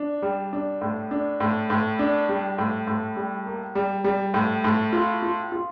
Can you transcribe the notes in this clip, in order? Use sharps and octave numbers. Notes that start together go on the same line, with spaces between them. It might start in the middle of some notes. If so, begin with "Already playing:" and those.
Already playing: D4
G3
D4
A2
D4
A2
A2
D4
G3
A2
A2
G3
A#3
G3
G3
A2
A2
F4
F4
F4